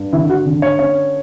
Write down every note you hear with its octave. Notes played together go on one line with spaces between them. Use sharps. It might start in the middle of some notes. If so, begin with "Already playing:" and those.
Already playing: G2
D3 E4
F#4
D3
C#5
C#4 C#5